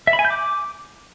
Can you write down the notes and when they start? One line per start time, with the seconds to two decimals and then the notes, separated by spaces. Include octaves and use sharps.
0.07 E5
0.13 B5
0.19 G#5
0.25 G6
0.30 D6